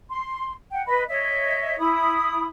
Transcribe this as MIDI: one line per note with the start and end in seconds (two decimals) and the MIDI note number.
0.10 0.52 84
0.71 0.83 78
0.71 0.83 79
0.87 1.03 71
0.87 1.03 75
0.87 1.03 83
1.08 1.75 73
1.08 1.75 75
1.08 1.75 76
1.79 2.45 64
1.79 2.45 83
1.79 2.45 87